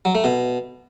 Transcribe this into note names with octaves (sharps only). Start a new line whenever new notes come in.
F#3
A3
B2